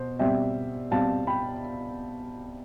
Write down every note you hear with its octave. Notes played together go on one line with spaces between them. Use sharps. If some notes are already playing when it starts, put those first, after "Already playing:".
Already playing: B2 C5
B2 G3 C4 E5 G5
B2 G3 C4 F5 A5
G5 B5